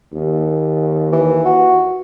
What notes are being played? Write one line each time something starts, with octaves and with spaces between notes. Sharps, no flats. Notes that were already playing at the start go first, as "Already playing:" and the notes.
D#2
E3
F#4